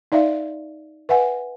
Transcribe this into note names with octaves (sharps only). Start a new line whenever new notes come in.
D#4 D5 E5 F5
B4 E5 F#5 G#5